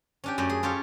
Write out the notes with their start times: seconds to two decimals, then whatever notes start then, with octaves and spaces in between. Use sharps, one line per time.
0.24 C#4 D4 G4
0.38 F#2 A3 G4 D5
0.49 G#4
0.63 C#4 F4 G4 A4 C#5